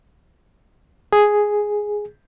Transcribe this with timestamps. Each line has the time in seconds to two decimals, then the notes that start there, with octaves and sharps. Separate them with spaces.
1.13 G#4